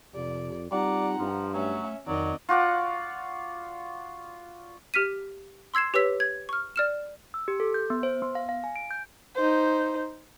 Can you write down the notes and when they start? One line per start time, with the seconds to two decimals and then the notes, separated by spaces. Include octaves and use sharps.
0.15 F2 C3 D5
0.72 G3 C4 D#4 F4 D5 F#5 A#5
1.19 G2 F3
1.53 F#3 A3 C#4 E5
2.07 F2 D#3 F#3 D5 D#5
2.49 F4 F#4 D5 F#5
4.94 G4 F6 B6 D#7
5.74 C6 E6 G#6 C7 E7
5.94 G4 B4 C#5 E6 B6
6.20 G#6
6.49 C#6 F6
6.76 D5 F6 E7
7.34 E6
7.48 G4
7.60 A4
7.74 G6
7.90 B3
8.03 C5
8.22 B3
8.35 F5
8.49 F5
8.64 G#5
8.76 D7
8.91 G6
9.36 D#4 C5